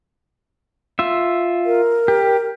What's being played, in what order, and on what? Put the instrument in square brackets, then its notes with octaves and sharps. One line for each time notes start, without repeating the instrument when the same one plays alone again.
[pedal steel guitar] F4 E5
[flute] A#4
[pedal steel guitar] G4